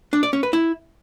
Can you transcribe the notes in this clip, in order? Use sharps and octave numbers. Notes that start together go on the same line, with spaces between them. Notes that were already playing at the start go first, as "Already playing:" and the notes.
D4
D5
C#4
B4
E4